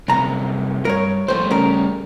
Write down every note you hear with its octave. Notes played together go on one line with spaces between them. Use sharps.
C2 F#2 C3 A#5
G2 A#4 C#5
F2 A2 G3 A3 C5
C#3 A#4